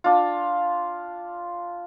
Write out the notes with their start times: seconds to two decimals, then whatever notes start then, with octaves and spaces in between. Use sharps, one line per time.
0.04 D4 F4